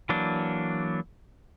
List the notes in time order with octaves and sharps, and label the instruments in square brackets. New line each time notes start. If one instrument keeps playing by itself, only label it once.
[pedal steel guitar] E3 F#3 A#3 D4